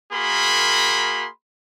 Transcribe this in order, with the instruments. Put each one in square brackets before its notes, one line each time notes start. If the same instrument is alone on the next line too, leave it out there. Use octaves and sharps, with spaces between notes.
[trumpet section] A#3 F#4 G#4 A#4 B5 C6